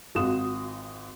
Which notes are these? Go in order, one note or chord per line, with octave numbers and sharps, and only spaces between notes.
G#1 F4 F#4 D#6 E7